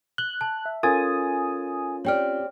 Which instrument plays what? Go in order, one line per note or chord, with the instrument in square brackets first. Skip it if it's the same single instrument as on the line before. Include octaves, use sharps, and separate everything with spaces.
[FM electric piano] F#6 [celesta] G7
[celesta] A5
[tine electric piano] E5
[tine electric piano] C#4 F4 [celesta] A4 A#4 A6 [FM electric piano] G#5 D#6
[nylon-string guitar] C4 G4 D5 [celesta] C#5 G5 F6